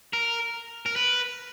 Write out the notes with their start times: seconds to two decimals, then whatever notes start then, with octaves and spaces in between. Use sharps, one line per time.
0.13 A#4
0.86 A#4
0.96 B4